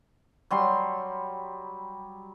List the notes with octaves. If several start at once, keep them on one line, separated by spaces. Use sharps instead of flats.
F#3 G3 C6